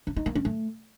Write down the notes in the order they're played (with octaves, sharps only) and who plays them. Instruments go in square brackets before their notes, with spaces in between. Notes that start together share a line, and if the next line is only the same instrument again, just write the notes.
[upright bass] C#4
D#4
A#3
C#4
A3